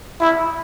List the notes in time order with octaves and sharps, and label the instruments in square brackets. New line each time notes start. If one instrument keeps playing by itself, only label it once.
[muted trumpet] E4